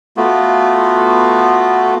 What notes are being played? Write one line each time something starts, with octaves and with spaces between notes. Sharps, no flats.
A3 B3 F4 F#4